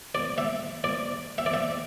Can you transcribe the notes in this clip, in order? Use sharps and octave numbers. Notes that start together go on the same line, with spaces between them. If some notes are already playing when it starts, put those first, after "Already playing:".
D5
E5
D5
E5
D5
E5